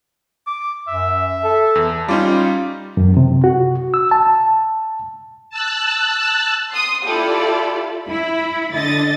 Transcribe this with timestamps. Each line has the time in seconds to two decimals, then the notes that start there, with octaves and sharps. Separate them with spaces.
0.47 D6
0.88 F#2 E5
1.44 A4
1.75 E2
2.08 G3 C#4 D#4 F4 D5
2.97 F#2
3.17 C3
3.44 F#4
3.94 E6
4.11 A5
5.50 A5 E6 F#6
6.71 C6 D#6
7.06 E4 F4 G4 A4 D5
8.05 E4 B5
8.73 D3 D#5 A6